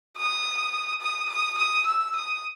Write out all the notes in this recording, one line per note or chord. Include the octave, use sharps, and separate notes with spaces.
D#6
D#6
D#6
D#6
E6
D#6